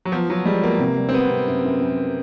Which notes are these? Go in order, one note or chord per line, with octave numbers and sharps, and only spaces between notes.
F#3
F3 B3
F3 F#3
G3 G#3
A#3 B3
C3
G3
C4
C3 B3
C3
F#2
F#2
F#2